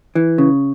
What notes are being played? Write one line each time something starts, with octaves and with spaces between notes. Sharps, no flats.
E3
C#3